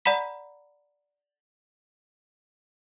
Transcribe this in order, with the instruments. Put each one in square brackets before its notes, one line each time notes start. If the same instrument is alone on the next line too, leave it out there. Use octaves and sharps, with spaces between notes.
[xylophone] D5 F#5 A#5 B5 B6